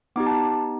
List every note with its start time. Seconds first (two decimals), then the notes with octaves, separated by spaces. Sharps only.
0.16 B3 D#4 G4 D6
0.26 A5